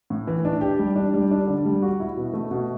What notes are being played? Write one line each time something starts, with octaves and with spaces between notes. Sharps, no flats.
A2
E3
D4
G4
G3
D4
G3
D4
D3
G3
F#4
E4
B2
A3
B2